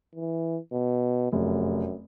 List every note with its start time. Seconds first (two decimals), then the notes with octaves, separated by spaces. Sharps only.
0.16 E3
0.73 B2
1.32 F1 F#2